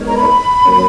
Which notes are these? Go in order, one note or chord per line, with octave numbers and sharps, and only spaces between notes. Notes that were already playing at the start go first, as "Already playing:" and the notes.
Already playing: G#3 B3 D#4 A#4 C#5
A#5
B5
F#3 A#3 C#4